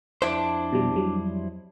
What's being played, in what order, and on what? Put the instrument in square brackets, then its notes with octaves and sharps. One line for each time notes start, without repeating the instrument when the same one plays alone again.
[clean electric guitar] F2 E4 C5 [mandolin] D4
[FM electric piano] B2 G3
F#3 G3